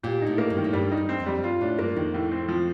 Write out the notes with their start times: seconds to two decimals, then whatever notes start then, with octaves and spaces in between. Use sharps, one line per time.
0.03 A#2 G4
0.22 A2 D#4
0.38 A#3
0.50 G2
0.57 D#3
0.64 A2
0.73 G2 G3
0.92 D#4
0.97 G2
1.09 C4
1.20 F2
1.26 G3
1.44 G2 F4
1.61 A2 D4
1.79 G2 A#3
1.97 F2 D#3
2.14 A2
2.32 C4
2.48 F3